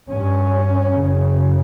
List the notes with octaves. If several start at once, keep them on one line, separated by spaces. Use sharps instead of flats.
G2 C#4
F#2 C#3